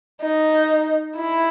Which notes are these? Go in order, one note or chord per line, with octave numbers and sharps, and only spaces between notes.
D#4
E4